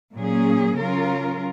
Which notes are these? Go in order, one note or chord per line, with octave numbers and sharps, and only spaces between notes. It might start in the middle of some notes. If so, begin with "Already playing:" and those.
A#2 F#3 A#3 C#4 G#4
C#3 F#3 C#4 F4 A#4